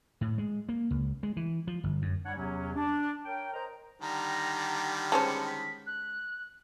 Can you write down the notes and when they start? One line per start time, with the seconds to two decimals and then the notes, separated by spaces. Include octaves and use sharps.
0.21 A2
0.38 G#3
0.69 A#3
0.91 C#2
1.23 G#3
1.37 E3
1.67 F3
1.84 G1
2.02 F#2
2.25 G3 D4 C#5 F#5
2.36 E2 C3 F#3 C#4
2.75 D4
3.26 A#4 C#5 G5
3.54 A#4 C5 D#5 A#5
4.01 D3 D#3 G3 A#5
5.12 G#3 C#4 C5 A5 C#7
5.47 B6
5.86 F#6